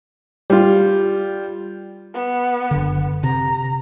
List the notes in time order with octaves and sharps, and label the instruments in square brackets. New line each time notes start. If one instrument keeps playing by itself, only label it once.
[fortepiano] G3 F4
[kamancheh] B3
[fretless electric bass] F#1 D3
[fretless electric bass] C3 [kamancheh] A#5